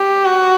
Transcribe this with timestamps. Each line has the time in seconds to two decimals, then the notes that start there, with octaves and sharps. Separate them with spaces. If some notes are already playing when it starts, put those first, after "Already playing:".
Already playing: G4
0.26 F#4